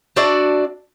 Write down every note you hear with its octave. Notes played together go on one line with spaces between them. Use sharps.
D4 F#4 D5 E5